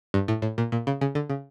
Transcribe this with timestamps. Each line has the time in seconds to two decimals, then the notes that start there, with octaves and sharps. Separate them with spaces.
0.14 G2
0.28 A2
0.42 A2
0.58 A#2
0.72 A#2
0.87 C#3
1.01 C#3
1.15 D3
1.30 C#3